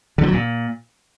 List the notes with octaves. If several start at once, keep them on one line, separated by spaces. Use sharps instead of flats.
D3
F3
F#3
A#2